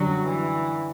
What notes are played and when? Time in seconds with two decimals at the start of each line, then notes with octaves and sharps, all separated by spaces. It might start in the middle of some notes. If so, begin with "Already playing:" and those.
Already playing: F#2 D3 F#3 G3 D4 F#4
0.25 E3